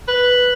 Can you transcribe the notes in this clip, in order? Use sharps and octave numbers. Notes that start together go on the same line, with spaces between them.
B4